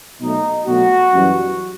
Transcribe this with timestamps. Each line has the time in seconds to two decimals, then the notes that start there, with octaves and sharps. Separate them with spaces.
0.21 B2 F#3 A3 D#4
0.66 B2 F#3 A3 F#4
1.12 F#2 E3 G3